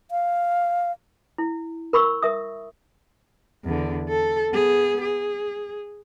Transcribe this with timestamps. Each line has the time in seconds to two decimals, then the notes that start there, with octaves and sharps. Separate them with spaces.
0.11 F5
1.38 E4
1.93 A#4 B5 C#6 E6
2.22 A#4 E5 D#6
3.65 E2 D3
4.09 A4
4.51 B3 G#4
5.01 G#4